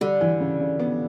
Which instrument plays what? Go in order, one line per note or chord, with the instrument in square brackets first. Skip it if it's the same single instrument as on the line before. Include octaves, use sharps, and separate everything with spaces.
[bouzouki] D3 [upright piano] G3
[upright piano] E3
C#3
C#3
B3